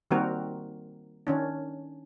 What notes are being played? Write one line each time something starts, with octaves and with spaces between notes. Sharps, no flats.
D#3 G3 A#3 C4 F#4 A#4
D#3 C#4 D4